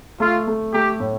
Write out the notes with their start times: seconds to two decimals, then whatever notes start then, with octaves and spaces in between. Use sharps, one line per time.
0.20 A3 F4
0.48 A3
0.73 A3 G4
1.00 A2